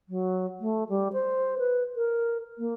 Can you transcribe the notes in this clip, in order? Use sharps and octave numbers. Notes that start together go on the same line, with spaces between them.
F#3
A3
G3
C5
B4
A#4
A#3